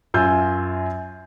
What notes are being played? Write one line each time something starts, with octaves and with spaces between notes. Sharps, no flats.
F#2 F4 G#5 E6 G6